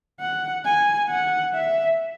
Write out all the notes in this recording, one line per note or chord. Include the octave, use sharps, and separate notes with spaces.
F#5
G#5
F#5
E5